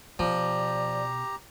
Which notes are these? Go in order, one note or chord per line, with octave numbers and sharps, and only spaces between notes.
B2 F3 G4 D5 A#5